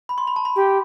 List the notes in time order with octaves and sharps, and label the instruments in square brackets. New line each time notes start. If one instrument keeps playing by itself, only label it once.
[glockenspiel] B5
C6
B5
A5
B5
[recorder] G4